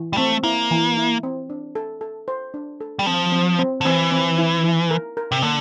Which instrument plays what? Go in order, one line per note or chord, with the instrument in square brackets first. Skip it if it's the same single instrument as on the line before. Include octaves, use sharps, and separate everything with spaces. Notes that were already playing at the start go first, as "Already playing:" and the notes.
Already playing: [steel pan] E3
[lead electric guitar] G3
[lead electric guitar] A3 [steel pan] C4
[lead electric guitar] A#3 [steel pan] E4
[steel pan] E3
E4
C4
D4
A4
A4
C5
D4
A4
[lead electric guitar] G3
[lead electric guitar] F3 [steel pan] C4
[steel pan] C4
C4
[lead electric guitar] D3
[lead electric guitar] E3 [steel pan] C4
[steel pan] C4
E4
E4
A#4
A#4
[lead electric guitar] C3
[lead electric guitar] D3 [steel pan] A#3